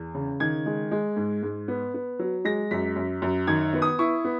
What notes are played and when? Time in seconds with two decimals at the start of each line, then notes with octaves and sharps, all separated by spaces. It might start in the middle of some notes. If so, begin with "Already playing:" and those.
Already playing: E2
0.15 C#3
0.40 D#3 G#6
0.66 G#3
0.91 G#3
1.17 G#2
1.43 G#2
1.68 B3
1.94 B3
2.19 F#3
2.45 G#3 A#6
2.71 F#2 B6
2.96 F#2
3.22 F#2
3.47 D#3 G#6
3.73 B3
3.82 D#6
3.99 E4 C#6
4.25 B3